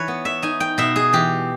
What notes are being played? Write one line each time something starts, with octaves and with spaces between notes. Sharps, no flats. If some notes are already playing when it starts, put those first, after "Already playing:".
Already playing: E3 B4 C#5
B3
E5
D#4 G#5
G5
B2 E5
G#4
E3 G4